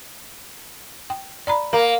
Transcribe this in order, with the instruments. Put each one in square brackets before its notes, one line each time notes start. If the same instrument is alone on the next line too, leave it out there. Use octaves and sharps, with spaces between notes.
[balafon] G5
D5 A#5 B5
[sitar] A#3 [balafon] A#4